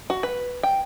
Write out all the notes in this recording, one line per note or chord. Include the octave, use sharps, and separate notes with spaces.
F#4
B4
G5